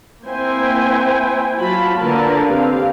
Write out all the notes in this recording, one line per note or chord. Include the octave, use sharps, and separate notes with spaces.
A#3 C4 E4 C5 G5 G#5
F#3 F4 F#4 A5 B5
D3 A#3 F4 A#4 B4 A5
C4 G4 F5